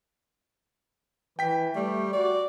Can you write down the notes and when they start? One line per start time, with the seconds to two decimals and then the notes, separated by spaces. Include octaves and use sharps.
1.39 E3 G5 B6
1.76 G3 A3
2.13 F#4 D5